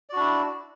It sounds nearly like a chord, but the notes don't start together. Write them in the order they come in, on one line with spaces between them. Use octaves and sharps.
D5 F#4 D4 E4